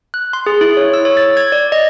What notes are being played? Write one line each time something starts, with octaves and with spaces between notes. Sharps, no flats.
F#6
C6
G#4
E4
C#5
E6
C#5
A6
G#6
D5
D#5